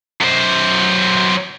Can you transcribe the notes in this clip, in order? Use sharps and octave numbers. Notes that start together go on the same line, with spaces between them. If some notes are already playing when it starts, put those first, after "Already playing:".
F#2 C5